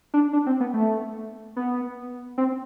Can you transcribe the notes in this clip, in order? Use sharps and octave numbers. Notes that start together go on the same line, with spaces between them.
D4
D4
C4
B3
A3
B3
C4